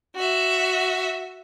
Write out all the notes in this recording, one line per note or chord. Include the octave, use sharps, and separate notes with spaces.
F#4 E5